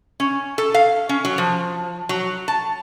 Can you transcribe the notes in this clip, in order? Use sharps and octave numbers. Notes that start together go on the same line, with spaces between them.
C#4
A4
F5
C#4
F#3
F3
F#3
A5